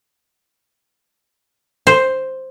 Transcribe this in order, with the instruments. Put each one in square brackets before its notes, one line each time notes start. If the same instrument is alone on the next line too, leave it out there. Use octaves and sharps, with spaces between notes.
[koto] C5